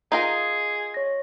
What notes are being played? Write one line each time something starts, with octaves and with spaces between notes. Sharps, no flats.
D#4 F4 G#4 A#4
C#5 A#6